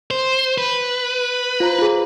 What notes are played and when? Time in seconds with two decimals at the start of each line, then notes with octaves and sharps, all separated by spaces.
0.11 C5
0.58 B4
1.60 F4 C5 A#5
1.79 F4 G#4